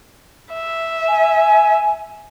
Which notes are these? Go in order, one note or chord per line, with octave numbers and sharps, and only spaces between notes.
E5
G#5